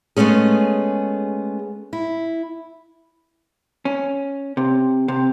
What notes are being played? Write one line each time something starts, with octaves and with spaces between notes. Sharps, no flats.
G#3 A3 B3 C#4 G#4
E4
C#4
C3
C3